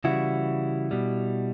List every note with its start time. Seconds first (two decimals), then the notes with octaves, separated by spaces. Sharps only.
0.04 C#3 E3 G3 E4 F#4
0.91 B2 G3